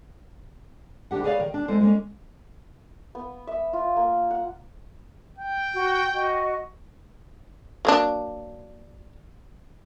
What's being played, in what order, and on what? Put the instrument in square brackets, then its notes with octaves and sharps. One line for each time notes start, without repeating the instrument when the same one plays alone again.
[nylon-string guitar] D2 D4 G4 F#5
G#4 B4 C#5 D5 E5 F5
D#3 A#4
D4
G#3 A3 C4 E4 A4 C5
G#3 A#3 C#4
[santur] B3
E5
F4
A#3
F#5
[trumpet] G5
[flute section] F#4
F#4 D#5
[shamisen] F#3 A#3 D4